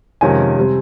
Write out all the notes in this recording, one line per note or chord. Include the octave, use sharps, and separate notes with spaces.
F2 C3 D#3 G#3 C#4 G#5
C3 G3 C4